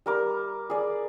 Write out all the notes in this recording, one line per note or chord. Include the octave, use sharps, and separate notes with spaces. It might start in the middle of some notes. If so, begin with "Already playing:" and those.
G3 A#4 D6
G#4 D5